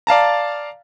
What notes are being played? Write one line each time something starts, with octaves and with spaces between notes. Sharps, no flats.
D5 F5 A5 A#5